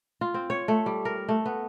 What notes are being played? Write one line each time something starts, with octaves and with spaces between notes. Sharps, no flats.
F4
C4
C#5
A3
G3
A#4
A3
B3